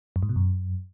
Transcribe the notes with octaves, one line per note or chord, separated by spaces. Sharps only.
F#2
G#2
B2
F#2